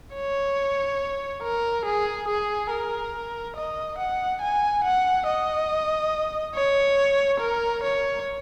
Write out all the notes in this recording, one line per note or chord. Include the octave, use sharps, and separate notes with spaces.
C#5
A#4
G#4
G#4
A#4
D#5
F#5
G#5
F#5
D#5
C#5
A#4
C#5